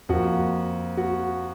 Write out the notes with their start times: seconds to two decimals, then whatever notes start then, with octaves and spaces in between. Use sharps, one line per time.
0.09 F2 F3 A#3 F#4
0.97 F#4